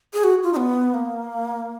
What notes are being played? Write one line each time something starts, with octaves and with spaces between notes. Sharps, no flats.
G#4
F#4
F4
D#4
B3
A#3